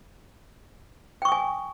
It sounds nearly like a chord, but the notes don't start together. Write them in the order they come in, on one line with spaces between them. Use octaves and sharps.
G5 C#6 D#6 G#5